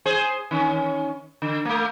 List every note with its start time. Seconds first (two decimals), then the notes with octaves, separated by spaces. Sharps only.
0.05 G#4 C5
0.51 D#3 C#4
1.42 D3
1.65 A3 A#3